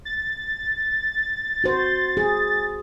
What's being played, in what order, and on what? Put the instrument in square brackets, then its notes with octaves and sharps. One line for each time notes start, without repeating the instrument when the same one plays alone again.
[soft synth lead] A6
[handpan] F#4 C5
G#4